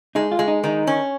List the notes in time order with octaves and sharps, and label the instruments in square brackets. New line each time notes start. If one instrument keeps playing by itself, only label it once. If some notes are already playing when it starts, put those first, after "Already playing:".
[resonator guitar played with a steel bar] G#3 [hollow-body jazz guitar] D#4
[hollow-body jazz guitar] F4
[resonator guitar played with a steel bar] G#3
[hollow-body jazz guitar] D#4
[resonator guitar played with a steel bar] D#3 [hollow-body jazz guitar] D#4
[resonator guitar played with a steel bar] C#4